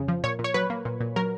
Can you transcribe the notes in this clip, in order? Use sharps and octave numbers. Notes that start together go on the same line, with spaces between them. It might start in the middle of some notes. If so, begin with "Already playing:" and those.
Already playing: F2 C#3
F3
A#2 C#5
A#2
C#5
F#3 B4
A#3
A#2
A#2
F#3 A#4